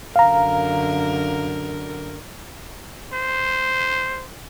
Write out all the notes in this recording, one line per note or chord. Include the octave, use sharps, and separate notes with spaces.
F#2 D3 A#4 F5 A#5
C5